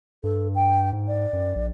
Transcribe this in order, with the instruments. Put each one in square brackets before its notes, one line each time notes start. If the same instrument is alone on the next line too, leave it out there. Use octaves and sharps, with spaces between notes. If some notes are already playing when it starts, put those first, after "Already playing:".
[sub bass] G2 [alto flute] A4
[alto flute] G5
[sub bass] G#2
[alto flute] D5
[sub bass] F#2
A#1